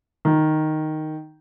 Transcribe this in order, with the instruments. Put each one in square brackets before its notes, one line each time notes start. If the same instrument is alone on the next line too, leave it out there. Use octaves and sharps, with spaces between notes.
[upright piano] D#3